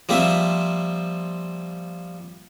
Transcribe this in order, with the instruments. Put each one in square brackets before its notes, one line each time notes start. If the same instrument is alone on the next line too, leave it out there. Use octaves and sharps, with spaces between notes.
[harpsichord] F3 G3 A#3 C4 E5